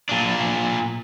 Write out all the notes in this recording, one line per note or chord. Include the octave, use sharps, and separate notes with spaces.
A#2 D4